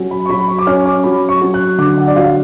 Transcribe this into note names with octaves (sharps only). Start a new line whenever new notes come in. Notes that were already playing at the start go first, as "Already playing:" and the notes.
Already playing: F#3 C#4
B5
C#6
F#3 B5
C#6
D6
C#4 F6
D6
F#3 B5
C#6
F#3
F#6
D3 D6
F#5
D5
F#3 F5